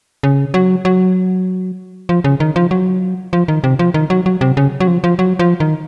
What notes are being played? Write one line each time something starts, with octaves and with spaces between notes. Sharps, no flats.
C#3
F#3
F#3
F3
C#3
D#3
F3
F#3
F3
D#3
C3
F3
D#3
F#3
F#3
C3
C#3
F#3
F3
F3
F#3
F3
D#3